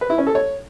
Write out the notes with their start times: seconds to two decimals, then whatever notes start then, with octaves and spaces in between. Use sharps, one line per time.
0.01 B4
0.10 E4
0.18 C#4
0.27 A4
0.35 C#5